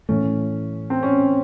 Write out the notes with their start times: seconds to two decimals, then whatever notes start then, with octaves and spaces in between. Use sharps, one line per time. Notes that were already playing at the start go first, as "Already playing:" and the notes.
0.09 A2 E3 A3 C#4
0.90 C4
1.03 C#4